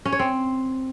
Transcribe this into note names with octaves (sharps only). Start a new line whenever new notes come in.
C#4
C#5
C4